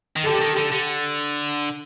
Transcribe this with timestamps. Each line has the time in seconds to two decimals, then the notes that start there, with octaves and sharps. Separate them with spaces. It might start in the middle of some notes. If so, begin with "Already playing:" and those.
0.16 D#3
0.26 D3 G4 A4
0.41 D#3
0.57 D3
0.72 D3